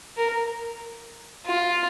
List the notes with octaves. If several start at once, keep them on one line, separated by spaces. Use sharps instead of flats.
A#4
F4